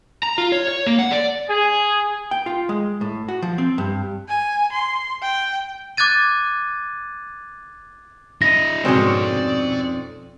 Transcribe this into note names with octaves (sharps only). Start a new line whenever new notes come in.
A#5
F4
C#5
C#5
A#3
F#5
D5
G#4
G5
F4
G#3
A2
F#4
F3
C4
G2
G#5
C6
G5
D6 F#6 G#6 A6 D#7
E4 D#5 A#6
F2 G#2 B2 G#3 C4 C#4 D5 C6